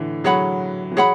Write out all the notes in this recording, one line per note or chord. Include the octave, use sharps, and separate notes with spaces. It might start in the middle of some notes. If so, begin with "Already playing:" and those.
Already playing: A2 D3 E3
F#3 G#4 C#5 F#5 B5
E3
F#3 G#4 C#5 F#5 B5